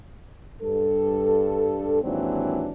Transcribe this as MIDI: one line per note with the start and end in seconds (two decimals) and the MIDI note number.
0.62 2.01 43
0.62 2.01 69
2.03 2.73 39
2.03 2.73 44
2.03 2.73 52
2.03 2.73 54
2.03 2.73 60
2.03 2.73 62